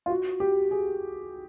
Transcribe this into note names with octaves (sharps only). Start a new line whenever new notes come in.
F4
F#4
G4
G#4